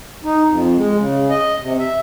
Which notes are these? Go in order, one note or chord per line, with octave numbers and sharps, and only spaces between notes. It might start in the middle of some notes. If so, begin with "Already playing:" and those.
D#4
F2
G#3
C#3
D#5
C3
E5